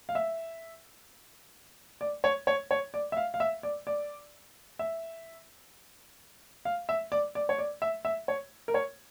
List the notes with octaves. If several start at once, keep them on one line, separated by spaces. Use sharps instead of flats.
F5
E5
D5
C#5
C#5
C#5
D5
E5
F5
F5
E5
D5
D5
E5
F5
E5
D5
D5
C#5
D5
E5
E5
C#5
A#4
C#5